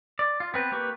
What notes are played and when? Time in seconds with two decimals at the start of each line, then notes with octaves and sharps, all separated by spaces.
0.19 D5
0.40 F4
0.54 B3 C4 B4
0.72 A#3 G4 B4 C#6